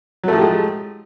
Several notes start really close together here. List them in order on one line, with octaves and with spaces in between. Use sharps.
F#3 A3 F3 G4 G#3